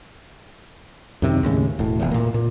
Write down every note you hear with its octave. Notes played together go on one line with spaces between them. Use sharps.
F#2 C3 D#3
D#2 A2 C#3
E1 A2
F1 E2
A#2 A#3
A#2